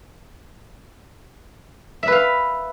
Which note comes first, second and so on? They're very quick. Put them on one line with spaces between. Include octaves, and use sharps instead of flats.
E5 B4 F5